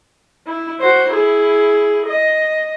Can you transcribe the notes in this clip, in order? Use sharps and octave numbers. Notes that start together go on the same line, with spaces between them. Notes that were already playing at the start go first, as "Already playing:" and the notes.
E4
F#4 C5
E4 G#4
D#5